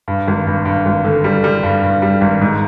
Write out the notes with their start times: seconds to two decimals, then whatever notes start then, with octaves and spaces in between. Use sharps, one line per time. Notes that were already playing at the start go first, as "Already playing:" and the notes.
0.08 G2
0.28 G#1
0.47 G2
0.65 G2
0.86 G#1
1.04 D3
1.24 G3
1.44 G3
1.63 G2
1.83 G2
2.02 G3
2.21 G#1
2.41 G#2